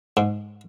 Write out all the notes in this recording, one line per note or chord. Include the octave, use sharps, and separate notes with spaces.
G#2